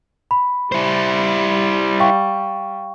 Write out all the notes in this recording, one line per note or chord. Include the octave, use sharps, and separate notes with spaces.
B5
G3 E4 C5
F5 G5 C#6